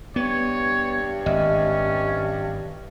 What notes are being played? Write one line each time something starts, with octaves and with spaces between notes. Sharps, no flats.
G2 B3 C#5
G#1 C#4 D#5 E5